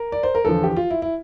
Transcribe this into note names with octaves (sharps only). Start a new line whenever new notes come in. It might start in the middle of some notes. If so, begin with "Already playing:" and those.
Already playing: A#4
D5
C5
A#4
E2 D3 F3 A4
G4
F4
E4
E4